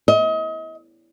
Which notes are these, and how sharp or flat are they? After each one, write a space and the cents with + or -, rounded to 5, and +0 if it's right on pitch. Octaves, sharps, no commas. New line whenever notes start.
D#5 +35